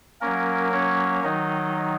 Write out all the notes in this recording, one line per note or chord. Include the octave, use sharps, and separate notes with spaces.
F#3 A#3 C#4 A#4
C#4 C#5
D#3 F#3 D#4 D#5